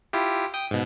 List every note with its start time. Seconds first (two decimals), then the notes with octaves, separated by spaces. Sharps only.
0.13 E4 F4 G4
0.54 G5 D#6
0.71 G#2 B2